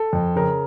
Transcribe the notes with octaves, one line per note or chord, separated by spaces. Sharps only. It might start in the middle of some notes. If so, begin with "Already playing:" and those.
Already playing: A4
F2
C#3 A#4